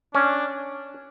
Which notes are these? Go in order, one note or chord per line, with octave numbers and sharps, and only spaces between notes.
C#4 D4